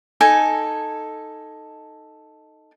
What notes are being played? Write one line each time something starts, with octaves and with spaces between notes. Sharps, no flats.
D#4 A4 G#5